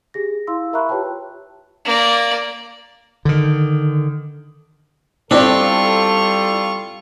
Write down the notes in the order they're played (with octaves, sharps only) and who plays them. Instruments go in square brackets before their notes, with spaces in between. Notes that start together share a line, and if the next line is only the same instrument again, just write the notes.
[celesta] G4 G#4 A#6
E4 F5 C6 E6
A#4 E5 A#5 B5 C#6 F#6
F4 G4 B4 C#5 G5 A5
[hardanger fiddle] A#3 D5
[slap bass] D3 D#3
[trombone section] G3 A4 [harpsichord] C4 D4 [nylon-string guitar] E4 D5 [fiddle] F4 C#6